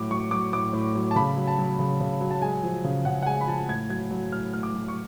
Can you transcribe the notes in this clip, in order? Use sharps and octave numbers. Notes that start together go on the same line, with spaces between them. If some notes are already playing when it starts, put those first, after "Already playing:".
Already playing: A2 F#3 D6
F#3 C#6
F#3 D6
A2 D6
A2
F#3
A5
C#3 B5
F#3
A5
F#3
C#3
C#3
F#3
A5
G#3 G#5
F3
C#3
C#3 F#5
F#5
G#3 G#5
B5
F3 A5
A2 G#6
F#3 G#6
F#3
A2 F6
A2 F6
D6
F#3
C#6